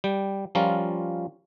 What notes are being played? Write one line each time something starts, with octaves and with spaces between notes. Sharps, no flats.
G3 G5
F3 G3 C#4 F4 A#4